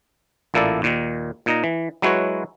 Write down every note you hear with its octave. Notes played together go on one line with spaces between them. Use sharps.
A1 A#2 A#3 E4 A4 D5
D#2 A#2 D#3
A#2 D#4 A#5
E3
F#3 G#3 E4 F#4 B4 C#5